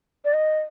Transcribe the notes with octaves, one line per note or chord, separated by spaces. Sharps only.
D5
D#5